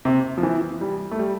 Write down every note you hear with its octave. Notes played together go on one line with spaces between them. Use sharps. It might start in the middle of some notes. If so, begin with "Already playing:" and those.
C3
F3
E3
G3
A3
G3